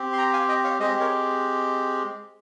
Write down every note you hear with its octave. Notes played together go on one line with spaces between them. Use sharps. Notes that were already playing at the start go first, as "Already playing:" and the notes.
Already playing: C4 G4
C6
G5 A#5
F5 G#5
D#5 G5
C#5 F5
G#3 C4 G4 C5 D#5
A#4 C#5